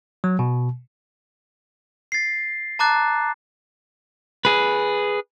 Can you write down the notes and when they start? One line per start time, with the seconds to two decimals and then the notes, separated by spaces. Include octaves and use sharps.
0.24 F#3
0.39 B2
2.12 A6 C7
2.79 A5 A#5 D6 F#6 A6
4.45 G#4 B4